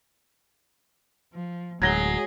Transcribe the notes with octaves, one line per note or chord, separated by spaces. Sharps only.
F3
D1 F#3 G#3 G#4 G#6 A#6 G7